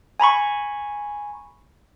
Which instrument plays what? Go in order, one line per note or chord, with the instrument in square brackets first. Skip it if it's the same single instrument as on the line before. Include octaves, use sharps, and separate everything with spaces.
[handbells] G#5 A#5 B5 C#6